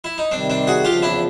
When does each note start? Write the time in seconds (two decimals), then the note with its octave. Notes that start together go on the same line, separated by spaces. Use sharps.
0.04 E4
0.18 D#4
0.31 C3 D#3 G3 C4 D4
0.50 C4 D4
0.67 F#4 G#4
0.85 E2 C#3 F3 F4 G4
1.02 D4 E4